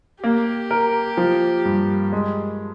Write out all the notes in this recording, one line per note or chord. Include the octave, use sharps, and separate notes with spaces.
A#3 G4
A#4
F3
G2
G#3